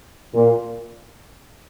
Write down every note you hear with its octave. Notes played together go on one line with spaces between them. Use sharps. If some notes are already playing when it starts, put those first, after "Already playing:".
A#2